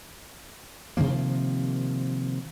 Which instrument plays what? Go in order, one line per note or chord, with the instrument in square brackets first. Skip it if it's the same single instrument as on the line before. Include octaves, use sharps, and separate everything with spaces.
[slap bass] C3 D#3 F3 A#3